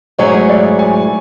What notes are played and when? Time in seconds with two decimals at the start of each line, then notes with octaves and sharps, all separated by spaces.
0.18 G#2 F#3 A3 E4 G#4 C#5
0.49 D5
0.79 G#5